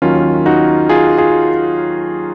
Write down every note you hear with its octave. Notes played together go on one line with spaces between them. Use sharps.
D#2 D#3 F#3 C#4 F4
D#4 F#4
F4 G#4
F4 G#4